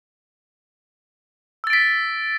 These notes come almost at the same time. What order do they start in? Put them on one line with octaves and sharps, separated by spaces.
E6 A6 D7 B6